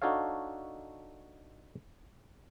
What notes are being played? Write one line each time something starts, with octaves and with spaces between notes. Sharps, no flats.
D4 D#4 F#4 A4 C#5 F5